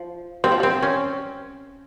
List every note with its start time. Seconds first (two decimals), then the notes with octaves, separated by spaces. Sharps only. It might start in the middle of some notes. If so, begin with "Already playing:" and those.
Already playing: F3
0.44 G3 C4
0.52 F3
0.60 G3 C4
0.82 C#4